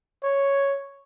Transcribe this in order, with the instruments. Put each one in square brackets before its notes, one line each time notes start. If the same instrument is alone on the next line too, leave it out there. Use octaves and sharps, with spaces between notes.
[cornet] C#5